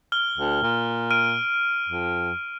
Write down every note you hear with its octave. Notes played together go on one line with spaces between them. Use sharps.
F6 G7
D2
A#2
F6 D7 D#7
F2